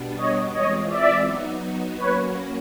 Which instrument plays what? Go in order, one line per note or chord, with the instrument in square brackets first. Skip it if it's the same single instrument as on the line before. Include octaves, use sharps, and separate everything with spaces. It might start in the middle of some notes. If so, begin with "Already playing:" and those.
Already playing: [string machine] B2 G3 B3 D4
[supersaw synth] C#5 D#5
[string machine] E3 G#3 C4 F4 [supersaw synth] C#5 D#5
[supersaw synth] D5 E5
[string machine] F#3 B3 D#4 F#4
[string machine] F#3 A#3 C#4 F#4 [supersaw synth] B4 C#5